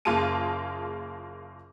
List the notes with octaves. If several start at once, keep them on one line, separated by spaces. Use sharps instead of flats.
F#1 A#3 F4 G#4 A5 D#7